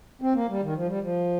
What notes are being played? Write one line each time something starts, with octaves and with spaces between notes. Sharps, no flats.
C4
A#3
G3
D#3
F3
G3
F3